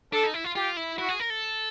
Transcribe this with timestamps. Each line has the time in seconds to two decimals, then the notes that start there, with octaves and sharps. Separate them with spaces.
0.12 D4 A4
0.23 D#4
0.34 E4
0.44 F4
0.56 F4 G4
0.77 E4
0.98 E4 F#4
1.09 G#4
1.20 A#4
1.30 A4